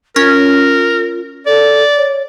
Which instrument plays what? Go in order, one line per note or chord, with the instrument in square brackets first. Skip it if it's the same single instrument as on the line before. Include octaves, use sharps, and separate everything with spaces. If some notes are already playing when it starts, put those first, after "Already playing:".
[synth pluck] C#4 [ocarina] F4 [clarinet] A#4
[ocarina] A4 [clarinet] D5
[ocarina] C#5